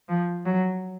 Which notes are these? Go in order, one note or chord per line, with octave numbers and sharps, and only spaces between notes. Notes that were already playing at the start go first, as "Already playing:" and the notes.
F3
F#3